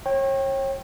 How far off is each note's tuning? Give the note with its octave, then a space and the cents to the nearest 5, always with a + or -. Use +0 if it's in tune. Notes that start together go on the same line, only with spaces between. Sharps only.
C#5 -35 G5 +0